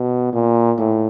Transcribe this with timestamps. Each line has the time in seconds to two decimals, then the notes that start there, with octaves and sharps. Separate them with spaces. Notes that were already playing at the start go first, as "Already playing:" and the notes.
Already playing: B2
0.33 A#2
0.78 A2